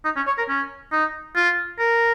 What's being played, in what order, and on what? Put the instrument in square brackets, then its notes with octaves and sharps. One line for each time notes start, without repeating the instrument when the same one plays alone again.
[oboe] D#4
C#4
C#5
A#4
C#4
D#4
F4
A#4